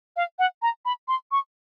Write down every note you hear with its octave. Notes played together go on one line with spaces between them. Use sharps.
F5
F#5
A#5
B5
C6
C#6